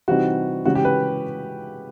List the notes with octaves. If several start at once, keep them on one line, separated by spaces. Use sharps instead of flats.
C3 E3 G3 C4 D#4 F#4
C#3 E3 G#3 C#4 F#4
G4
B4